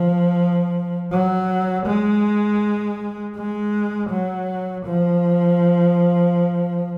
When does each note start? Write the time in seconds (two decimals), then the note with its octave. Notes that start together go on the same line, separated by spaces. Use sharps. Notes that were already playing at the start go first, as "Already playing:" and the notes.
Already playing: F3
1.11 F#3
1.86 G#3
3.36 G#3
4.10 F#3
4.85 F3